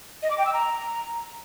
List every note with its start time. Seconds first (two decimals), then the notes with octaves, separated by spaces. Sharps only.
0.23 D#5
0.30 D6
0.38 G5
0.46 E6
0.53 A#5